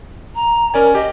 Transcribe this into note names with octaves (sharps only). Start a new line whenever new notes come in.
A#5
C#4 A#4 D5 G#5
G4 D#5